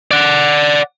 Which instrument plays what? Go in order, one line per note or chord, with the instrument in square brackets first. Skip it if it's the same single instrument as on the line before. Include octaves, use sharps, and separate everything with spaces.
[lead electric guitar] D5 F#5